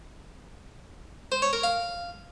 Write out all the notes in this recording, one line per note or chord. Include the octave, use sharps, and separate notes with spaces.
C5
C#5
A#4
F5